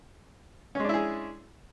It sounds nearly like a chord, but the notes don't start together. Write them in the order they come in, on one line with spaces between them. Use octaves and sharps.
C#4 G#3 D4 E4 G#4